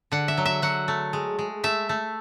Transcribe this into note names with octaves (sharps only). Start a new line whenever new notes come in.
D3 F#5
E5
F#3
E5
F#3 F#5
A3
G#3
G#3
A3 E5
A3